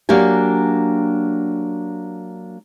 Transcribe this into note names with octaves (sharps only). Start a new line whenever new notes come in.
F#3 A#3 D4 G4 G#5